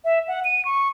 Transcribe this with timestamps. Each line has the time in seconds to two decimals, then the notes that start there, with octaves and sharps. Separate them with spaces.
0.05 E5
0.28 F#5
0.44 D#7
0.65 C#6